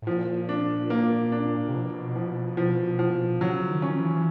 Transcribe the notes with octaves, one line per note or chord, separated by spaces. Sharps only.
A2
A#2 F3
D4
A#3
D4
C3
B2 F3
F3
F3
F3
C#3 F#3
D#3
C#4
E3
E3